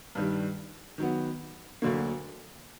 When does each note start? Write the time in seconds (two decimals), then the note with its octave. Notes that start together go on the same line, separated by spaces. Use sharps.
0.15 G2 D#3 G3
0.98 D#3 F#3 B3
1.82 D2 D3 F#3 A#3